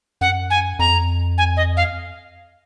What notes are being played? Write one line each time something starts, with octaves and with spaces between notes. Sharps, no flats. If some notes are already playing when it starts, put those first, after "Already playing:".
F#2 F#5
G#5
F2 A#5
G#5
D#5
F5